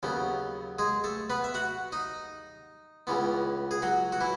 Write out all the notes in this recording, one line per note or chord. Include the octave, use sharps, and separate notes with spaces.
D#2 C#3 F#3 B3
G#3 G#4
A3 A4
B3 B4
E5
F#4 F#5
D#4 D#5
C#2 C#3 E3 B3
G#4
F#3 F#4
F#4
E3 E4